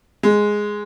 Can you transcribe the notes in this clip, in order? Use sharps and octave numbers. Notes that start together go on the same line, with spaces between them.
G#3